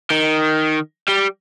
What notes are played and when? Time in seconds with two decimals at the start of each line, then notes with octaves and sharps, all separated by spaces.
0.11 D#3
1.08 G3